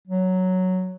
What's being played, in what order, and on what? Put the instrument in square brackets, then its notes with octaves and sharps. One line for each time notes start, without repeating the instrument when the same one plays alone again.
[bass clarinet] F#3